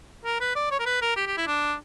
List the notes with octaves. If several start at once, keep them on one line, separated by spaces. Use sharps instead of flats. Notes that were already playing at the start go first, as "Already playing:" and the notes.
A#4
B4
D5
C#5
A#4
B4
A#4
G4
G4
E4
D4